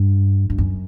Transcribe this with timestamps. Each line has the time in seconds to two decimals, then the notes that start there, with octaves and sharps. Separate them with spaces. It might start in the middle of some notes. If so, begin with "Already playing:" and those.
Already playing: G2
0.50 G2
0.58 F#2